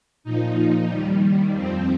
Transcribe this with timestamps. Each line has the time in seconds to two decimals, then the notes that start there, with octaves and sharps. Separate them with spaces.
0.24 A#2 F3 D#4
0.89 D#2 D#3 G3
1.55 F2 F3 C4